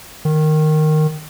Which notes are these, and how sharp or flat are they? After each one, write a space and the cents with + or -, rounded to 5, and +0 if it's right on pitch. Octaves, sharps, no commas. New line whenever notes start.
D#3 -10